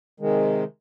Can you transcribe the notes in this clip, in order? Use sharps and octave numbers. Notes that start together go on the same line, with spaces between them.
C3 D#3 G#3